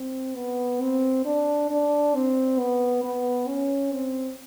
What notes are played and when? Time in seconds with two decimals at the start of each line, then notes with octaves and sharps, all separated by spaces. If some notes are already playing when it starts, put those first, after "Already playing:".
Already playing: C4
0.35 B3
0.81 C4
1.25 D4
1.70 D4
2.15 C4
2.59 B3
3.04 B3
3.48 C#4
3.93 C4